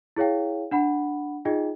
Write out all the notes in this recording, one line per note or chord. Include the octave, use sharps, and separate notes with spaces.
E4 G#4 C#5 F5 G5
D4 F#5 B5
D#4 F4 G#4 D#5 G5